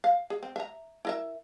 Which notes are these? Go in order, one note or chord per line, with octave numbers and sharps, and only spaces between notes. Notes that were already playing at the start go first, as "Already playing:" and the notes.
F5
G#4
C4
E5 A#5
E4 A#4 E5